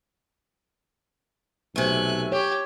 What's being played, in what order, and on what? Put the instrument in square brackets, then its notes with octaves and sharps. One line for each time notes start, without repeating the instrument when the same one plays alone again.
[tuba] B1 [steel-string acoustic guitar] C3 A3 [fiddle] G#5 F#6
[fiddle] G4 [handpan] C#5